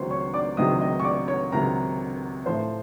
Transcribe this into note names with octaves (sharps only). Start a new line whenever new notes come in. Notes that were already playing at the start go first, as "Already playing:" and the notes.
Already playing: C#2 C3 D#3 F#3 C5 C6 C#6
C#5 C#6
D5 D6
C#2 C3 D#3 F#3 D#5 D#6
D#5 D#6
C#6
D5 D6
C#5 C#6
C#2 C3 D#3 F#3 A#4 A#5
A2 F3 C5 C6